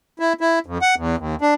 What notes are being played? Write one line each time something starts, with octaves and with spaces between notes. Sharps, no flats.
E4
E4
F2
F#5
E2
D#2
D4